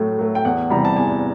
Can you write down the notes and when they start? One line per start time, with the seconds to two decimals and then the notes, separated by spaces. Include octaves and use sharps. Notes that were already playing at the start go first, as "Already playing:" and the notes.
Already playing: A2 F#3 A3
0.19 F#3 A3
0.35 G5
0.45 E2 F#5
0.70 C3 E3 G3 A#5
0.85 A5
0.96 E2 G#5